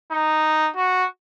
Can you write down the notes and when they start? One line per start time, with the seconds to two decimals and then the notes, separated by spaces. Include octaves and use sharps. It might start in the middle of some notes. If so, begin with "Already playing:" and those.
0.11 D#4
0.76 F#4